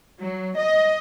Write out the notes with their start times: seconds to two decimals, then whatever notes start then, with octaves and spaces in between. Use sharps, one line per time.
0.21 F#3
0.57 D#5